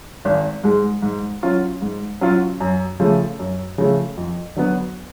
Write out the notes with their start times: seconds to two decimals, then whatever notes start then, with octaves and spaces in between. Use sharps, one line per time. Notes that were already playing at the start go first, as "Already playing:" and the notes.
0.25 G#1
0.64 G#2 G#3
1.02 G#2
1.43 F#3 C#4 F4
1.82 G#2
2.21 F#3 C#4 F4
2.60 F#2
3.00 C#3 F3 A3
3.39 F#2
3.78 C#3 F3 A3
4.17 F2
4.56 D3 F#3 B3